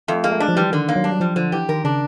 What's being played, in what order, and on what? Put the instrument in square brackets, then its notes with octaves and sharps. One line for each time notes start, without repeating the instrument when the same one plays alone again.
[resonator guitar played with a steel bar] F2 [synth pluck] A3
[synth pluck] G#3 [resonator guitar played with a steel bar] A#3
[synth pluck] A3
[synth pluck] G#3 [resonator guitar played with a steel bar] D4
[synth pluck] F3
[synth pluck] E3 [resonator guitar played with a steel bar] G3
[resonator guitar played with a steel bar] D3 [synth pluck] D#3
[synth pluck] D#3 [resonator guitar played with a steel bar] A#3
[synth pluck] F#3
[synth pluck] G3 [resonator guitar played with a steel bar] D4
[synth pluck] F#3
[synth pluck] F3 [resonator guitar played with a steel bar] G3
[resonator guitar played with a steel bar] D3 [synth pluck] F3
[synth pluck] E3 [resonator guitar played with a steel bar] G4
[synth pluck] D#3 [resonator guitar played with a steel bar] A#4
[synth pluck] C#3 [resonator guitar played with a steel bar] D4